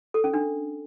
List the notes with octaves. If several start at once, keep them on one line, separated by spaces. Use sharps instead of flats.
A4
C#4
D4